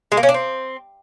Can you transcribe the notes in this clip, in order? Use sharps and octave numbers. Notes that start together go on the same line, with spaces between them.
G#3
A#3
C#4
D4
C4